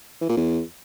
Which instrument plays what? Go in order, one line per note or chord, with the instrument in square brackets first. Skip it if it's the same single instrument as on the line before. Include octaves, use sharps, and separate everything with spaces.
[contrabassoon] E3
A#2
E2